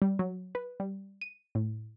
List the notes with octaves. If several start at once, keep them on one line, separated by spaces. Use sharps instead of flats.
G3
F#3
B4
G3
D#7
A2